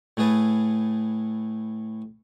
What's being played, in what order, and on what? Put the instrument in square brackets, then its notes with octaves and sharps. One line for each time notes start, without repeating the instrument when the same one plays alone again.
[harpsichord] A2 A3 G#4 B4 A5